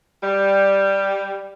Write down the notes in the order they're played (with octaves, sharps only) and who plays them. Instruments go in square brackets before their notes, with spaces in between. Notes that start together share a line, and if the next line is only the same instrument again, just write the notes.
[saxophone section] G3